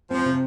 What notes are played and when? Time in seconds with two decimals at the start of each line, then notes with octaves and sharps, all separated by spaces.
0.10 F3 C4
0.25 C3